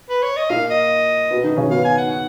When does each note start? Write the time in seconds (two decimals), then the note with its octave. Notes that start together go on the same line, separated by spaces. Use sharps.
0.09 B4
0.23 C#5
0.36 D#5
0.50 A#2 A#3 F5
0.70 D#5
1.31 B2 B3
1.44 D#3 D#4
1.57 C#3 C#4
1.70 B2 B3 F5
1.84 G#5
1.98 F#5
2.11 F#5